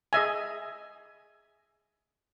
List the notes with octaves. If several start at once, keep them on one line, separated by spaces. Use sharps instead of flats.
G#4 D#5 E5 G#5